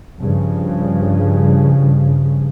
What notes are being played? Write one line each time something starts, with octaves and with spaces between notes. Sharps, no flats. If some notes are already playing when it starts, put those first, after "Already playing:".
G2 C#3 F3